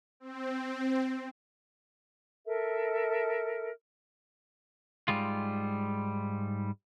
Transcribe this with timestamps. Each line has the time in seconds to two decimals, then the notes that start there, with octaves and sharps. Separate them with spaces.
0.20 C4
2.45 A4 A#4 E5
5.08 G#2 G3 G#3 F4